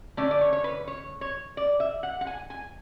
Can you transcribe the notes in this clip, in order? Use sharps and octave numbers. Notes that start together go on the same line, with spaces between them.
D3 A3 C#4 D5
D5
C#5
C#5
B4
C#5
C#5
D5
E5
F#5
F#5
G#5
G#5